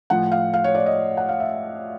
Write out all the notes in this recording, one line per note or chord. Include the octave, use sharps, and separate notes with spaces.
A2 F3 F#5
F5
F5
C#5
D5
D#5
F#5
F5
E5